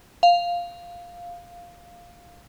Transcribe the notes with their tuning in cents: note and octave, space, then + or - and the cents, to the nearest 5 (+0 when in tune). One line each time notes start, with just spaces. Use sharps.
F5 +0